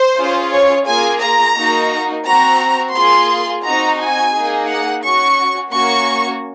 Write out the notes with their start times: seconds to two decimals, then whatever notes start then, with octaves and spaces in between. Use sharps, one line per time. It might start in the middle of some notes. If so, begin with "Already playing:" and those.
Already playing: C5
0.16 C#4 F4 G#4
0.52 C#5
0.86 A#3 F4 G#4 G#5
1.20 A#5
1.56 A#3 D#4 F#4
2.25 C4 F#4 A#5
2.94 A#3 F4 G#4 C6
3.64 C4 D#4 F#4 A#5
3.99 G#5
4.33 A#3 D#4 G#4
4.69 F#5
5.03 C#4 F#4 C#6
5.72 A#3 C#4 F#4 C#6